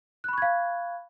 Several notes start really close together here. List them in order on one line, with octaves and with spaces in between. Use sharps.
F#6 B5 C#6 G#6 F5